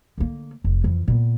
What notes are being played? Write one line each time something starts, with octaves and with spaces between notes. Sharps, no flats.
D3 A#3
F1
F2 E3
A#2 B3